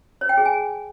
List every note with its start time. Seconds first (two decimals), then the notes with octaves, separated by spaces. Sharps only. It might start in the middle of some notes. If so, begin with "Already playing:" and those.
0.21 C#5
0.29 G5
0.37 G#4
0.45 G#5